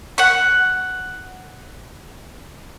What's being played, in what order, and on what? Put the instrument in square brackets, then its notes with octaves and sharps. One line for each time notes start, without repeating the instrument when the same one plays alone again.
[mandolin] F#5 C#6